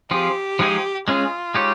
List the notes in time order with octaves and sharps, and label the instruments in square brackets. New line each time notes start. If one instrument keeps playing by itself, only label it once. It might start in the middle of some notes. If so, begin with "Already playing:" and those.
[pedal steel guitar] F3 C4 F4 G#4 [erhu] G4
[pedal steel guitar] F3 G#3 D#4 G#4 D#5
[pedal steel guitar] G#3 C#4 G#4 [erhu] F4
[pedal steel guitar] G#3 D#4 G4 C#5